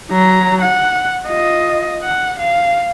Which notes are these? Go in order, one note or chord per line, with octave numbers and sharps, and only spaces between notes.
F#3 A#5
F#5
F4 D#5
F#5
F5